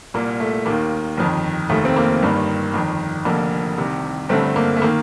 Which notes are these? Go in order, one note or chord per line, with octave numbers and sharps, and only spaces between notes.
C2 A#2 A#3
A3
D#2 D#3 A#3
G1 F2 D#3
F1 D#2 D#3 A3
C4
A#3
G1 G2 D#3
G1 F2 D#3
F1 F2 D3 A#3
C2 C3 D#3
G1 G2 D3 A3 C4
A#3
A3
D#3 A#3